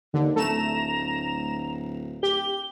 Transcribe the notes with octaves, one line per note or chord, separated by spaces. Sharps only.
D#2 D3
D1 A3 A#5 E7
G4 G7